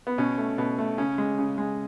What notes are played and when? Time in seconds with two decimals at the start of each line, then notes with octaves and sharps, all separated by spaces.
0.07 B3
0.18 B2 C#4
0.38 A3
0.58 B2
0.78 A3
0.98 C#3 C#4
1.18 G#3
1.39 C#3
1.58 G#3